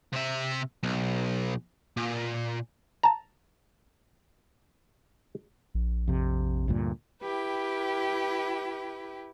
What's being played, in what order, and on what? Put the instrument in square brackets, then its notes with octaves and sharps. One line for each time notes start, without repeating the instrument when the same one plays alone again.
[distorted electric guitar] C3 E5
B1
A#2
[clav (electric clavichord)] A5 A#5
[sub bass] A#1
[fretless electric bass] F2 C3
D2 G2 A#2
[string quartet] E4 G4 B4 G5